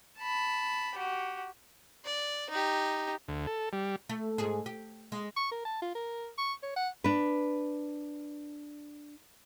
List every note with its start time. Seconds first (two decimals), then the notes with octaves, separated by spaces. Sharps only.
0.19 A5 B5
0.95 F#4 G4
2.05 D5
2.49 D#4 G4
3.28 D2
3.47 A4
3.73 G3
4.09 A3
4.38 G#2 G#4
4.66 G4
5.12 G#3
5.37 C#6
5.51 A#4
5.65 A5
5.82 F4
5.95 A#4
6.38 C#6
6.63 C#5
6.76 F#5
7.04 D4 B4